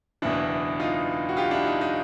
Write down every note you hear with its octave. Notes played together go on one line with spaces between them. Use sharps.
F#1 E2 B2 D4 E4
D#4 F4
F#4
F4 G4
D4 E4
D#4
D#4